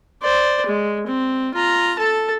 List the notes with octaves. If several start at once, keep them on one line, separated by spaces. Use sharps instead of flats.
C5 D5
G#3
C4
F4 A#5
A4 A5